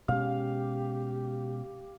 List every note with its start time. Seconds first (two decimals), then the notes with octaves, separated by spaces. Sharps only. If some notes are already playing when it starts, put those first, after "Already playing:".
0.08 B2 G#3 C#4 G4 F5